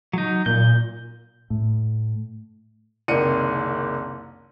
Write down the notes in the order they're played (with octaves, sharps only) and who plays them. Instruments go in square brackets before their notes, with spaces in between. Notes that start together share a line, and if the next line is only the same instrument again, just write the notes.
[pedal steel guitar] F#3 D#4
[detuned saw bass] A#2 [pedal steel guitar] G6
[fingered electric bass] A2
[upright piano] F#1 C2 D#3 D5 C#7 D#7